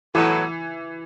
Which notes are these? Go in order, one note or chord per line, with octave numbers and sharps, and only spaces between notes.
A2 E3 F#3 B3 E4